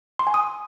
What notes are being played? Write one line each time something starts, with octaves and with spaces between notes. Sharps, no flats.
C6
G#5
D#6